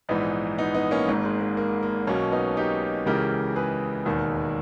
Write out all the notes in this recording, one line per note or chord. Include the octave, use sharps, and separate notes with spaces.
A#1 G#2 E3 B3 D#4
B3 D#4
B3 D#4
A#3 C#4
G#1 G#2 D#3 A#3
G#3
A#3
A#3
A#3
B1 B2 A#3 C#4
B3 D#4
D#4 G4
C#2 C#3 E3 G4 A#4
G#4 B4
E1 D#2 D#3